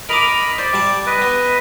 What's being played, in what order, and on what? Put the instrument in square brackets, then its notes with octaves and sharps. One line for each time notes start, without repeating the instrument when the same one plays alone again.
[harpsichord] A#4 A#5 D6 [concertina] D#5 B5
[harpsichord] C5 [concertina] D5
[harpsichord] G3 A5
[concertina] B4 D#5
[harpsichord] B3